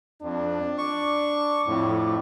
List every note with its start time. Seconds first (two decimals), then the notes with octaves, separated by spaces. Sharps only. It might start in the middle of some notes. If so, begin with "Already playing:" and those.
0.22 F2 D4
0.78 C#6 D6
1.67 F2 A2